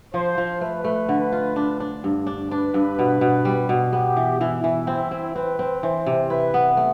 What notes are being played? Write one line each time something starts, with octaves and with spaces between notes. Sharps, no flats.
F3 C5
F3
A3 B4
A3
D3
F4
D4
D4
G2
D4
D4 B4
G2
B2
B2
G3
B2
B3 G4
E3
E3 E4
E3
C4 E4
C4
C4 B4
C4
E3 C5
C3
E4 B4
B3
A3